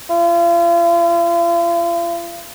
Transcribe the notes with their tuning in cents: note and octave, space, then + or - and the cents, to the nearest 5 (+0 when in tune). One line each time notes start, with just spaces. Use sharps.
F4 -40